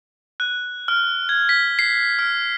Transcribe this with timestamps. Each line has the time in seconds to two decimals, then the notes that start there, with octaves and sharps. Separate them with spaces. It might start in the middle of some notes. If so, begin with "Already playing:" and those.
0.40 F#6
0.88 F6
1.29 G#6
1.49 B6
1.79 C7
2.19 F6